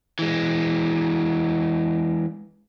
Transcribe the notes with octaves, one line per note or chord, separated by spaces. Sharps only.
E3 G#3